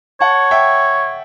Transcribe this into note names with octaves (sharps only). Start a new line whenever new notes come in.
C#5 F#5 A5
E5 G5